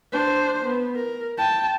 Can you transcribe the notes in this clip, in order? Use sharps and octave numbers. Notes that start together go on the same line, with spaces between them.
D4 C5
B3
A#4
G5 A5